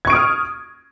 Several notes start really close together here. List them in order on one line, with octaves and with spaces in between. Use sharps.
G#6 C#6 D7 D#6 F6